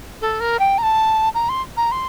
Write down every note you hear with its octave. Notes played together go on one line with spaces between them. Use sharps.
A4
A#4
G5
A#5
A5
A#5
C6
A#5
C6